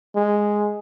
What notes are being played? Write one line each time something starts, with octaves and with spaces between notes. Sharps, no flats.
G#3